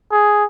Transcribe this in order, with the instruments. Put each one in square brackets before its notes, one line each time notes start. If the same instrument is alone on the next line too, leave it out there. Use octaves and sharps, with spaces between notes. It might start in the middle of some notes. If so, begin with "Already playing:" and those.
[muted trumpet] G#4